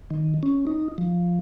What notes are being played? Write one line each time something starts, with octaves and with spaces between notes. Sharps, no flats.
D#3
C#4
D#4
F3